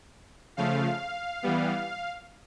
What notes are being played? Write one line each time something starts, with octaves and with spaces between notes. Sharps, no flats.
C#3 F3 A3 F5
E3 G3 B3